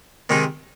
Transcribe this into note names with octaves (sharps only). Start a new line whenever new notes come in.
C3 D#3 G#3 D#4